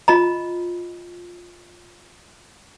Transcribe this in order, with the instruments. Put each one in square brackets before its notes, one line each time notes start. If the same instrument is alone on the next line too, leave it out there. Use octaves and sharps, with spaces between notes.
[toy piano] F4 D#5 A#5